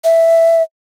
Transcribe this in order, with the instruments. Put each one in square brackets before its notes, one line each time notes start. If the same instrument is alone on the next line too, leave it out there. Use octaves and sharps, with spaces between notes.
[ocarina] E5